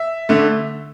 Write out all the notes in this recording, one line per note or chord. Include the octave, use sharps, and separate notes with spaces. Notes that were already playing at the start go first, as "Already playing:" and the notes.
Already playing: E5
D3 A3